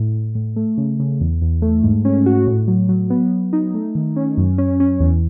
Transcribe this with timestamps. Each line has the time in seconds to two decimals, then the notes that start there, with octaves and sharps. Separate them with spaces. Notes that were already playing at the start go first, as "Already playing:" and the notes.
Already playing: A2
0.15 A2
0.35 A2
0.56 A3
0.78 C#3
0.99 C#3
1.21 E2
1.42 E2
1.62 A3
1.83 G#2
2.05 C#4
2.26 F#4
2.48 A2
2.68 F#3
2.89 F#3
3.10 B3
3.32 B3
3.53 D#4
3.74 A3
3.95 D#3
4.16 C#4
4.37 F#2
4.58 C#4
4.80 C#4
5.00 E2